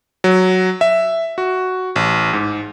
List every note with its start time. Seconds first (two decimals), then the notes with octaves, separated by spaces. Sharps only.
0.24 F#3
0.81 E5
1.38 F#4
1.96 A1
2.33 G#2